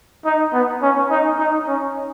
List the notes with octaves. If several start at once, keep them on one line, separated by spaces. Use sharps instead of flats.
D#4
B3
C#4
D#4
D#4
C#4